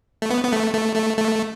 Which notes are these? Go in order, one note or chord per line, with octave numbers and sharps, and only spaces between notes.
A3
B3
B3
A3
A3
A3
A3